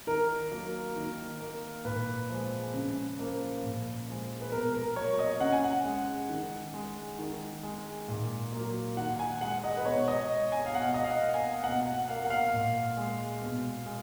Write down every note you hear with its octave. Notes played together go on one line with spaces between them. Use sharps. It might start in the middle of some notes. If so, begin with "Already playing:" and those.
D#3 A#4
F#3 A#3
D#3
A#3
A#2 B4
F3 G#3
C#3
F3 A#3
A#2
F3 G#3
B4
B2 A#4
A#4
F#3 A#3 C#5
D#5
C#3 F#5
G#5
F#5
G#3
D#3
G#3
D#3
G#3
A#2
F#3 A#3
D#3 F#5
G#5
G#3 F#5
D#5
B4
B2 C#5
D#5
G#3
G#5
F5
B2 F#5
D#5
F5
A#3
G#5
B2 F#5
F#5
A#3 F5
F#5
F5
A#2
G#3
B2
G#3